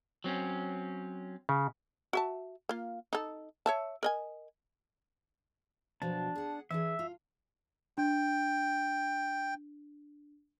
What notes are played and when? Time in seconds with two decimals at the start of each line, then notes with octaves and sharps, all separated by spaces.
0.24 F#3 C4 C#4
1.49 C#3
2.13 F#4 E5 A5
2.69 A#3 F4
3.13 D#4 A4
3.66 C#5 E5 A5
4.03 A#4 D#5 G#5
6.02 B2 F3 F#3 D4 A5
6.35 G#4 F#5
6.71 E3 D4 G#4 E5
6.99 F4
7.98 D4 G5